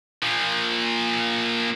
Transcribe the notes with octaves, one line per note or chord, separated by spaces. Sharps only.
A#2 F3